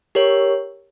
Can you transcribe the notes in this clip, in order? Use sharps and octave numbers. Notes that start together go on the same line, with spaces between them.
G4 A#4 C#5